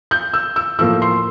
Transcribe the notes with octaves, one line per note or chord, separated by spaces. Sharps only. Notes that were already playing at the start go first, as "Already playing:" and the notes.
G6
E6
E6
A2 F3 A#3 E6
C6